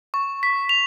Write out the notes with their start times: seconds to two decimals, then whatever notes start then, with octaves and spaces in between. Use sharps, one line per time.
0.14 C#6
0.43 B6
0.69 F7